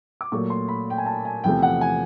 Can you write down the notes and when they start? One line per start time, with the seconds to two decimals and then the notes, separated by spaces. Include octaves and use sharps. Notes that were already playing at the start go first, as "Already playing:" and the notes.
0.21 D6
0.32 A#2 F#3 A3 C#6
0.50 C6
0.68 B5
0.90 G5
0.98 G#5
1.06 A5
1.25 G#5
1.44 E2 C3 F3 A3 G5
1.62 F#5
1.81 G#5